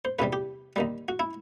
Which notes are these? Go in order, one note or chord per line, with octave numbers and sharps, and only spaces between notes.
C5
E2 C3 E3 G3 B4
G4
D#2 D#3 G3
F#4
E4